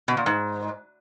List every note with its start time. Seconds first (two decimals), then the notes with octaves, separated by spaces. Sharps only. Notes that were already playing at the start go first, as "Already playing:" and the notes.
0.08 B2
0.17 A#2
0.26 G#2